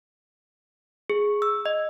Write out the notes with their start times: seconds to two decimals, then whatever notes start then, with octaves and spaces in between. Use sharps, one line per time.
1.10 G#4
1.42 E6
1.66 D#5